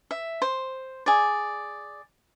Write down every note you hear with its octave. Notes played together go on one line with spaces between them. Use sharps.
E5
C5
G#4 D5